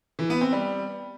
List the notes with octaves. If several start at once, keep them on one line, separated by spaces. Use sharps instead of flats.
E3
B3
C4
G3